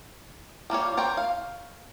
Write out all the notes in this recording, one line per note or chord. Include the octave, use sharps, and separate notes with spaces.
G3 A#3 F4 C#5
A#4 C5 C#5 G5
F5